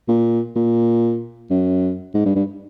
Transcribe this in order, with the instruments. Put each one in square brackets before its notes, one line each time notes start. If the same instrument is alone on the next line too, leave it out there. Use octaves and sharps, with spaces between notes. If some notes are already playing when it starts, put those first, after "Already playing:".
[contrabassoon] A#2
A#2
F#2
G#2
G2
G2